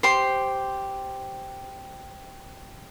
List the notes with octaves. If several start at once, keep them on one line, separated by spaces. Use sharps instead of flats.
G4 C5 C6